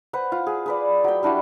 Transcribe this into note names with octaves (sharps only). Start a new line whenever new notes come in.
B4 C5 F#5
F4
G#4
G#4 B4 D5
F#3 G5
G3 D4 E4 F#4